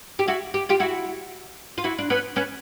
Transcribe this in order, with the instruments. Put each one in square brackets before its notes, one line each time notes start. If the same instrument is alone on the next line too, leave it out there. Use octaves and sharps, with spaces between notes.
[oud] G4
E4 F#4
G4
F4 G4
E4 F#4
F4
E4 F#4
D4
B3 C#4
B3 C#4